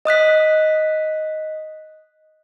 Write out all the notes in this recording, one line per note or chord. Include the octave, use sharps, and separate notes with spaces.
D#5 D#6 F#6 B6